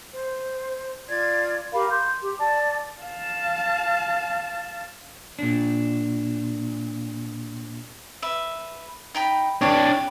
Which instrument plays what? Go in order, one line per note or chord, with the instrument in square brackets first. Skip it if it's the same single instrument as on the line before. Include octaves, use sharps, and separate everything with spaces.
[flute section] C5
F4 D5 G#6
G4 A#4 F5 B5
C6 G6
G4
D5 A5
[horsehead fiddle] F5 A5
[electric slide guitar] A#2 D4
[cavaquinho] B4 E5
D#4 G5 B5
[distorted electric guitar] D4 C#5 [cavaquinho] G4 B4